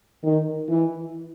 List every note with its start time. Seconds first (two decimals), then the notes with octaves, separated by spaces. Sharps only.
0.24 D#3
0.70 E3